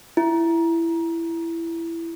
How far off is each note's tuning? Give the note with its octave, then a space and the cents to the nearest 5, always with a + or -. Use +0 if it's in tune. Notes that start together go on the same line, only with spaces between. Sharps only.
E4 +15